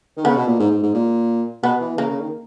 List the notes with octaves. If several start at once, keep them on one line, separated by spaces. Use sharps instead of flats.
D#3
C#3 B3
B2
A#2
G#2
G#2
G#2
A#2
B2 B3
E3
C#3 A#3
C#3
D#3